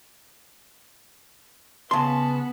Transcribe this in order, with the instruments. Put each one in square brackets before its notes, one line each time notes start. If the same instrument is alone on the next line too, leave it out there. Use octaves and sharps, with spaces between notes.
[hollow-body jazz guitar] C#3 C6 [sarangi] B3 [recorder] A5